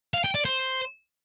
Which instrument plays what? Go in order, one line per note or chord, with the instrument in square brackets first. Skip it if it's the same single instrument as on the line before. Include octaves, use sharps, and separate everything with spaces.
[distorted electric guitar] F5
G5
D5
C5